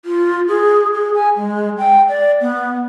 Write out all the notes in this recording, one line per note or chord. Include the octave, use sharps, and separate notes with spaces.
F4
G#4
G#4
G#5
G#3
G5
D5
B3